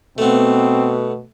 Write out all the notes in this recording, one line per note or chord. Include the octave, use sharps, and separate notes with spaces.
B2 A3 B3 C4